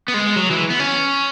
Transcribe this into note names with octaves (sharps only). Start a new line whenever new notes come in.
B3
G#3
F#3
E3
B3
C#4